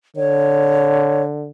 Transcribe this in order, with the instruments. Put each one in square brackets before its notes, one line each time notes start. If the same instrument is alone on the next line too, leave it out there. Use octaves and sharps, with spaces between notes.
[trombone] D3 [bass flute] C#5